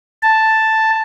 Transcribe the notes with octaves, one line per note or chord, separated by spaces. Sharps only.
A5